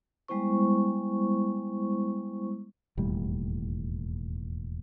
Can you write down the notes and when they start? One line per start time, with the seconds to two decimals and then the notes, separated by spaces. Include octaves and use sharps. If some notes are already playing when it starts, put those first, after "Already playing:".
0.28 G3 G#3 B3 E4 C5 C#6
2.97 E1 D#2 A2 G3